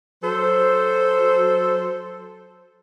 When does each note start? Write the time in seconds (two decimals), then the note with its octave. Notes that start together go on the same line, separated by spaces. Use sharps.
0.23 F#3 A4 C5